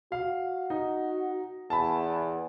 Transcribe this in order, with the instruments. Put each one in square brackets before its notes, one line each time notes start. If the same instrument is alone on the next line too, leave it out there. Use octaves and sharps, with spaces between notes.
[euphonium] F#4 [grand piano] F5
[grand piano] D#4
[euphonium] E2 [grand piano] A5 B5